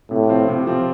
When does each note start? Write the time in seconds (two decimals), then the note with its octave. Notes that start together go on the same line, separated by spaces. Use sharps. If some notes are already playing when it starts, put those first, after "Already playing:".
0.11 A2 C3
0.29 F3 C4 F4
0.48 C3
0.66 F3 C4 F4